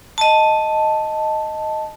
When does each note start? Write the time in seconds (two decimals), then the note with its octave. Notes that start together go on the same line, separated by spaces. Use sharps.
0.18 D#5 A5